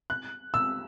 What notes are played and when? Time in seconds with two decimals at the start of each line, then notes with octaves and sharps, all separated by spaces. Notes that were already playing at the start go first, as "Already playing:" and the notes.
0.10 F#6
0.54 E6